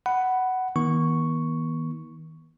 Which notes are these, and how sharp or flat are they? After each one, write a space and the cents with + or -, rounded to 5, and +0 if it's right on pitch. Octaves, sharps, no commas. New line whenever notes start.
F#5 +10 B5 +0
D#3 +35 B3 -45 C#6 +0